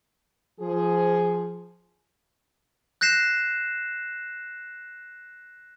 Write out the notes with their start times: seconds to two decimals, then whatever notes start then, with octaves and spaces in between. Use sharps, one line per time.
0.60 F3 G#4
3.01 F#6 G6 A#6 C7 E7